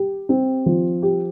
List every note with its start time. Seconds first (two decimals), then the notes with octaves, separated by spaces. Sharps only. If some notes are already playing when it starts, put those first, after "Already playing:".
Already playing: G4
0.29 C4
0.66 F3
1.02 G4